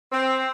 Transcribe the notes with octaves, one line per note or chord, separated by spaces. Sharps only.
C4